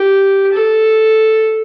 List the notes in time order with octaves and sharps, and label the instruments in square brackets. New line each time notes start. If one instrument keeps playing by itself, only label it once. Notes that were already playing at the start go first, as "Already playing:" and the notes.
Already playing: [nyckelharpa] G4
A4